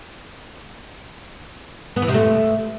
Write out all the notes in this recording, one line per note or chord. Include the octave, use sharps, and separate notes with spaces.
B3
E3
C3
A3